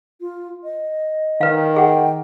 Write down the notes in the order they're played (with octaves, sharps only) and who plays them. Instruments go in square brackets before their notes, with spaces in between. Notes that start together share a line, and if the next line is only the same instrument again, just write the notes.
[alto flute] F4
D#5
[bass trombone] D#3 [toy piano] B4 F5
[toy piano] G#4 F#5 [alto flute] G5